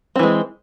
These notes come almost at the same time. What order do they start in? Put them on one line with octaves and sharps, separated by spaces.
C4 E3 G#3